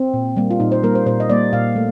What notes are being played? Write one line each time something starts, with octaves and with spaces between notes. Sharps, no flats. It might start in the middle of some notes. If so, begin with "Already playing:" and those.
Already playing: C4
A#2
G3 A#3
F4
A#2 D#4
C5
G3 A#3 A#4
C5
A#2 C5
D#5
G3 A#3 D5
A#2 F5
A3